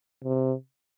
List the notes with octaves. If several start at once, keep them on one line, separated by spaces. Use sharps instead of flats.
C3